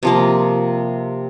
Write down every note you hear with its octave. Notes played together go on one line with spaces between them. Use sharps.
C3 F3 A#3